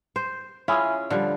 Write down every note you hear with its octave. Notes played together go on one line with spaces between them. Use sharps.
C5
C#4 E4 F4 G#4
D3 F3 G3